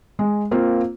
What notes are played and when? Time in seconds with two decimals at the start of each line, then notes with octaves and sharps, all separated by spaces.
0.19 G#3
0.51 A#3 C4 F4